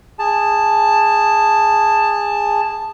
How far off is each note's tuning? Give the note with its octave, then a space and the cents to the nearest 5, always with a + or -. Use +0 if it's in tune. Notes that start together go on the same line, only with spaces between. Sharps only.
G#4 -15 A5 +0